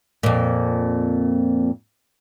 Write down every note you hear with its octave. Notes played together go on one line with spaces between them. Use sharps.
F2 A#2